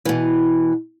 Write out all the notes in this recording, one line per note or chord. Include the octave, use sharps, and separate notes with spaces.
B2 E3